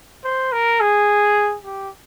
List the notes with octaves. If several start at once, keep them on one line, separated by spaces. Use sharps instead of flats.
C5
A#4
G#4
G4